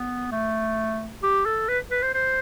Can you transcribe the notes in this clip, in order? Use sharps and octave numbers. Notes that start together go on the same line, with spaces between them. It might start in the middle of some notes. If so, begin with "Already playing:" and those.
Already playing: B3
A3
G4
A4
B4
B4
C5
C5